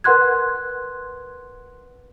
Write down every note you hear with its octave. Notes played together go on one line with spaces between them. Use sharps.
A#4 B4 F#5 C6 F#6 G#6